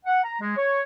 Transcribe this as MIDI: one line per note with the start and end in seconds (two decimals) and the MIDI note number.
0.06 0.22 78
0.24 0.36 82
0.41 0.55 56
0.57 0.80 73